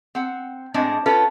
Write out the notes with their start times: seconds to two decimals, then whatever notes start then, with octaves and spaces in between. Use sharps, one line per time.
0.15 C4 F#5
0.74 A2 G#3 C4 D4 D#5
1.06 C#4 F4 A4 B4